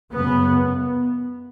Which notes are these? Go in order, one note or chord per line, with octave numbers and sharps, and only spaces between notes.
F#2 C#3 B3